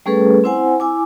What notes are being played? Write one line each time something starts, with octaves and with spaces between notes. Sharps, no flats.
G3 A3 C#4 G#4 A4 B4
C4 E4 C5 F#5 G#5
E4 G#5 D6